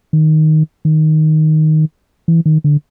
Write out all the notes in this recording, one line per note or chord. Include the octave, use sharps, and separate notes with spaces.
D#3
D#3
E3
D#3
D3